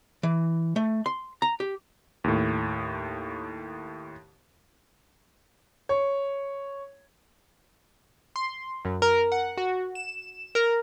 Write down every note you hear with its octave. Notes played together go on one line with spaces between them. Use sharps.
E3
A3
C6
A#5
G4
D#2 A2
C#5
C6
F#2
A#4
F#5
F#4
E7
A#4